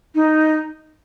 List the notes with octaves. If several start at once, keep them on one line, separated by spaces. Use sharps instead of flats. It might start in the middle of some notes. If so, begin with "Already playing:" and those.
D#4